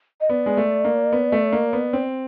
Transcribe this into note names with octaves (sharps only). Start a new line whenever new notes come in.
D#5
B3 D5
G#3
A3
A#3
B3
A3
A#3
B3
C4